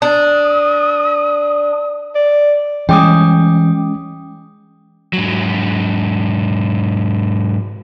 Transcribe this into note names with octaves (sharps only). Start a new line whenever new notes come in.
D4 D#6
D5
E3 G3 G#3 C#4 G5 D6 D#6
G#2 F#3